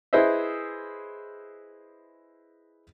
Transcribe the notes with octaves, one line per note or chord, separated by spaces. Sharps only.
E4 G#4 B4 C5 D#5 E5